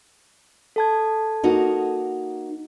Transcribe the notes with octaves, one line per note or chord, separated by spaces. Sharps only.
A4 A5 G#6
A#3 D#4 F#4